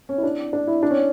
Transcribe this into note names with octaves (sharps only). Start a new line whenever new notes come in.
C#4
E4
D4
D4
E4
D4
C#4